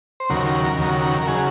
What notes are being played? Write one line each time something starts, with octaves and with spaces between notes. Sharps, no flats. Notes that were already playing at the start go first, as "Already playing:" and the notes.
C5
D#2 C#3 F#3 A#4
D#2 C#3 F#3
A#4
C#3 F#3 G#4